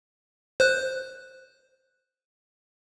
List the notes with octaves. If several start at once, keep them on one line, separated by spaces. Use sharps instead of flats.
C5 F#6